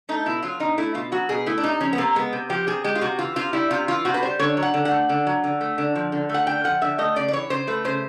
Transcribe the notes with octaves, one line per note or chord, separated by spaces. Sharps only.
A3 D#4
B2 E4
F#3 F4
B2 D#4
A3 E4
B2 F4
F#3 F#4
B2 G#4
A3 E4
D4
C3 D#4
F3 C#4
B3
C3 A#3
G#3 B3
C3
F3 G4
C3 G#4
G#3 G4
F4
C3 F#4
E3 F4
C3 F4
G3 E4
C3 F4
E3 F4
C3 F#4
B4
G3 C5
D3 C#5
F#3
F#5
D3
F#5
A3
D3
F#3
D3
A3
D3
F3
D3
A3 F#5
D3 G5
F3 F#5
D3 E5
A3 D#5
C#3 D5
D5
E3 C#5
C#3 C5
A3 B4
C#3 C5